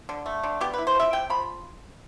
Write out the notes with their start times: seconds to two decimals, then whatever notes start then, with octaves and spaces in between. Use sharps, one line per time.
0.09 D3
0.26 A3
0.43 D3
0.61 B3 G4
0.74 B4
0.78 E4
0.87 C5
0.95 F3 E5
1.13 C3 G5
1.30 F3 B5